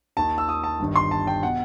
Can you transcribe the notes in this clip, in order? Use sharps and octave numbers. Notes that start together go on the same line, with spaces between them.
D#2 D#3 A5
E6
D#6
A5
G1 G2 D#3
C6
A5
G5
B2 F#5